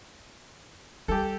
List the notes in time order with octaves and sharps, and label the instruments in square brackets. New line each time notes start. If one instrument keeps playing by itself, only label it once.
[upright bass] G3 [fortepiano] G4 A4